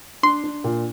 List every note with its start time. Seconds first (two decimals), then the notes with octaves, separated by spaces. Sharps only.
0.23 D4 C6
0.44 D4
0.64 A#2